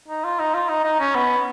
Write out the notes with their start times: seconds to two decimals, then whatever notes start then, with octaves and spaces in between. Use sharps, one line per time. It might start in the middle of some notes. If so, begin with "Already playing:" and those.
0.08 D#4
0.24 F4
0.39 D#4
0.54 F4
0.69 D#4
0.84 D#4
1.00 C#4
1.15 B3